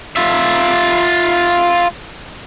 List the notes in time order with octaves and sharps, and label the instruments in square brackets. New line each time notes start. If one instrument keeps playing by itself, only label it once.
[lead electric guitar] F4 E5